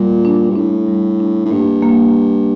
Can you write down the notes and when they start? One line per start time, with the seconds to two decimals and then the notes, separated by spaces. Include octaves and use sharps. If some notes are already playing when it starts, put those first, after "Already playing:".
Already playing: A#2 G3
0.25 D4
0.50 G2
0.56 A2 D4
0.88 G3
1.20 D4
1.46 A2
1.51 G2 A#3
1.82 A#3